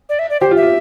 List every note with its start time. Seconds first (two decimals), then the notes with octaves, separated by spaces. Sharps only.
0.09 D5
0.19 E5
0.30 D5
0.41 G4 C5
0.51 F4
0.56 E5
0.62 F4